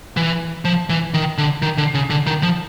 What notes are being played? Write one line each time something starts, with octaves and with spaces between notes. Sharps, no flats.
E3
F3
E3
D#3
D3
D#3
D3
C#3
D3
D#3
F3